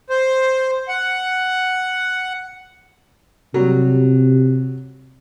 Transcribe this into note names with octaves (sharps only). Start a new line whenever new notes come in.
C5
F#5
C3 F#3 G3